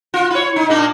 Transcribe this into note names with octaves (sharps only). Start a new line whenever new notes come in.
F4
E4 C#5
D#4
A#2 A#3 D4